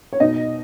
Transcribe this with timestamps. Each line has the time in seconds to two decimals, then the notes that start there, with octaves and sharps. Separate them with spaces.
0.13 C#5
0.20 B2 D#4 D#5